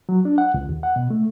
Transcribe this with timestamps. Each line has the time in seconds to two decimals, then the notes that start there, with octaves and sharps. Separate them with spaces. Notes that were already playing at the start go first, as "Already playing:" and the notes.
0.09 F#3
0.25 D4
0.38 F#5
0.54 C#2
0.69 D#2
0.83 F#5
0.96 B2
1.10 A3